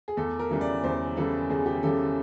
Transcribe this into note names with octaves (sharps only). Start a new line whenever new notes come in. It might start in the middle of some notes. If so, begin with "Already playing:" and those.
G#4
E2 A4
A#4
C#3 E3 G3
D5
E2 C5
C#3 E3 G3 A4
E2 G#4
G4
C#3 E3 G3 A4